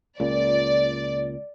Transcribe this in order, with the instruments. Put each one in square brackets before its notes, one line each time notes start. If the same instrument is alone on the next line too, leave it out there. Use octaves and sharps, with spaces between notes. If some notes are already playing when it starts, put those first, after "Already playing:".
[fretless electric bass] C#2 A#2 [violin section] D5